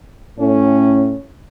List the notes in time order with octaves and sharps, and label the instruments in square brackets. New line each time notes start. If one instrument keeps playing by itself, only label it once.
[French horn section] A2 C#4